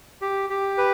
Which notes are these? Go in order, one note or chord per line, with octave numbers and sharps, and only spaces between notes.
G4
G4
B4